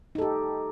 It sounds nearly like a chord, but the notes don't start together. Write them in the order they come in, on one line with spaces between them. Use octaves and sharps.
D#4 A4 G4